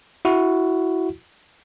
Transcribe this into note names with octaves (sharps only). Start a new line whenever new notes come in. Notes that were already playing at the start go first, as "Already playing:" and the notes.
E4 F#4